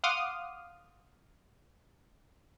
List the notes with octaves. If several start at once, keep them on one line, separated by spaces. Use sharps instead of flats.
F5 F#5 C6 D6 D#6 F6